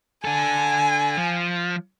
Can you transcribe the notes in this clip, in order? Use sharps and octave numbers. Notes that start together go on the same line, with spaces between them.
D4 A4 G#5
F3